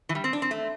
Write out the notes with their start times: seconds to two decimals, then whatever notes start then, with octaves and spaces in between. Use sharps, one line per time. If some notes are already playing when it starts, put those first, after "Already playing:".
0.09 E3
0.15 G3
0.24 C4
0.33 D4
0.42 C4
0.51 A3